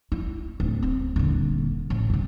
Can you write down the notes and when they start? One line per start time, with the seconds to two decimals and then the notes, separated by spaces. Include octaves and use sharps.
0.12 E4
0.60 D1
0.83 C4
1.16 D#1 D3
1.90 A1
2.10 F#2 C3